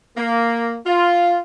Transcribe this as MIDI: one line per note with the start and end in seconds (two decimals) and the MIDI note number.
0.17 0.76 58
0.85 1.39 65